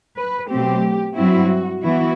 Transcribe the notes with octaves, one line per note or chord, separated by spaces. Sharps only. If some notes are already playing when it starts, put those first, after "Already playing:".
B4
B2 F#3 A3 C4 G4
G2 F#3 C4 E4 F#4
E3 B3 E4 F#4